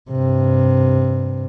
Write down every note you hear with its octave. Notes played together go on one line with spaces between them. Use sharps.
G2 C3